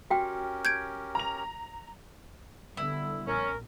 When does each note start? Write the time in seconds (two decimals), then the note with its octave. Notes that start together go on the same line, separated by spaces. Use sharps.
0.10 C#4 F#4 G4 A#4 G5
0.65 G6 G#6 D7
1.15 A#5 F7
2.77 D3 G3 B3 E4
3.27 A#1 C#4 A#4